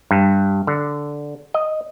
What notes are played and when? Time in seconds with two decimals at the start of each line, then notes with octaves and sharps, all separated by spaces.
0.11 G2
0.67 D3
1.54 D#5